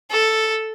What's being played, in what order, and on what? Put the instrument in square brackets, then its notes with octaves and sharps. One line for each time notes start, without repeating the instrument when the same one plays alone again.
[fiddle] A4